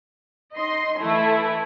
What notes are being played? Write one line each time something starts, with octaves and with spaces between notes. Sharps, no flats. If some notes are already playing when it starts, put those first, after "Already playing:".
D#4 D#5 C6
E3 A3 E4